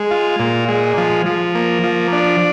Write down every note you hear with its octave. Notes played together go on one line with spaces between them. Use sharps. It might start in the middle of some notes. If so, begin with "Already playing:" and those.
Already playing: G#3
F4
A#2
G#3
F3
F3
A#3
F3
D4